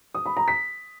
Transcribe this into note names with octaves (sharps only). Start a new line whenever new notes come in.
D#6
B5
A#5
B6